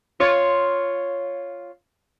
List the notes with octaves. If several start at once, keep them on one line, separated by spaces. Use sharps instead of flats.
F4 C#5